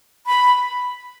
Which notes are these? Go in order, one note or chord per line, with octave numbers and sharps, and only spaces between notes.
B5